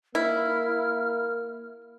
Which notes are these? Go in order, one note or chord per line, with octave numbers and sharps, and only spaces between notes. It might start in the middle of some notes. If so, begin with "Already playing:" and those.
A#3 E4 F6